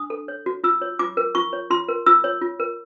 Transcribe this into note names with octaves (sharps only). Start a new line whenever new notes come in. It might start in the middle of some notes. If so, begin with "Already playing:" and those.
Already playing: D4 D#6
A4
C#5
F#4
F4 E6
C#5
F4 D6
A#4
F4 C#6
C#5
F4 C6
A#4
F4 E6
C#5
F4
A#4